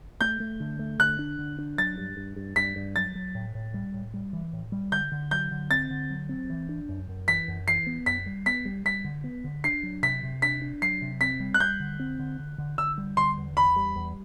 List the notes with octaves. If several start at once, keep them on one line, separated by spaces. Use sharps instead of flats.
A3 G6
A3
D3
A3
D3 F#6
D4
D3
D4
F#3 A6
G2
G2
G2
G2 B6
G2
F#3 A6
F#3
A2
A2
G3
A2
G3
E3
A2
G3
D3 G6
D3
F#3 G6
D3
C4 A6
D3
F#3
C4
E3
D4
F#2
F#2
E3 B6
F#2
E3 C7
B3
F#2 B6
G3
B3 B6
G3
G3 B6
D3
B3
D3
D4 C7
F#3
C3 B6
C3
D4 B6
D4
F#3 C7
C3
C4 B6
G3
F#6
G3 G6
D3
C4
D3
D3
D3
D3 E6
G3
D3 C6
E2
E2 B5
G3
E2